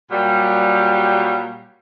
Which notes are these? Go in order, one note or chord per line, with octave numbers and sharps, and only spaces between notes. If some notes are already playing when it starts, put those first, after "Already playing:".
A#2 F#3 G3